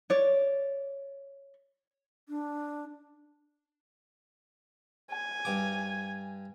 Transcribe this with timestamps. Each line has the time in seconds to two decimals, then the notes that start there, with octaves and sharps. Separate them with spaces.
0.10 C#5 D5
2.29 D4
5.11 G#5
5.45 G2 D6